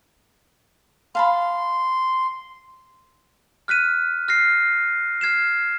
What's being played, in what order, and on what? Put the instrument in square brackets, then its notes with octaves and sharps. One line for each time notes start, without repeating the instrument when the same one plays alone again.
[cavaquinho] F5 A5 B5 [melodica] C6
[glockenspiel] F6 F#6 B6 D#7
F6 A#6 C7
F6 G#6 C7 E7